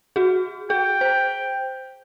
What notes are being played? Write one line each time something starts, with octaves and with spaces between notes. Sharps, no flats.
F#4 G#4
G#4 G5
C5